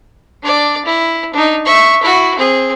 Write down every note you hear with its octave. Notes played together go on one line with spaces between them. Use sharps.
D4 D5
E4
D4 D#4
E5 C#6
E4 F#4
C4 G#4